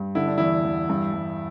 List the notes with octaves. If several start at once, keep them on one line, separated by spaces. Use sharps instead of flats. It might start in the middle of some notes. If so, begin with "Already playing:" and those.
Already playing: G2
D3 E4
D4
E2 E4
E2
G2
G2